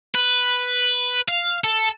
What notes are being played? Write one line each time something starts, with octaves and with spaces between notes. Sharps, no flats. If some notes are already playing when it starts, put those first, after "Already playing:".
B4
F5
A4